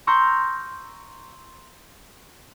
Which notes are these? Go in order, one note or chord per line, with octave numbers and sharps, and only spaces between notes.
A#5 C6 C#6 E6 F6 G6